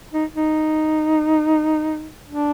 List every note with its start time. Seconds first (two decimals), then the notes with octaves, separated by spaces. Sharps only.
0.14 D#4
0.36 D#4
2.28 D4